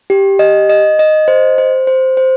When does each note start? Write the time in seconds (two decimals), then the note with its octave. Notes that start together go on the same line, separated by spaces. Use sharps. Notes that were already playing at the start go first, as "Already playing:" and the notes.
0.10 G4
0.39 D#5
0.69 D#5
0.99 D#5
1.28 C5
1.58 C5
1.87 C5
2.17 C5